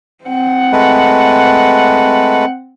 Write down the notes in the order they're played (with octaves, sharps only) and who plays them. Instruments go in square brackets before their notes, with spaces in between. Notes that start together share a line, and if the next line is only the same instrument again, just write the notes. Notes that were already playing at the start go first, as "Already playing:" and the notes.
[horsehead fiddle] C4 F#5
[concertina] G#3 A3 B4